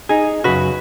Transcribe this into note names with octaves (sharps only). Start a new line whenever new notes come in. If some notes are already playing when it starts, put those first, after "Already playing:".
D#4 G#4
F#2 C#3 F#4 B4